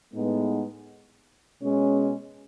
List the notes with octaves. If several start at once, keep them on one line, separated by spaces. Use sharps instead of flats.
A2 G#3 B3 D#4
B2 G#3 C#4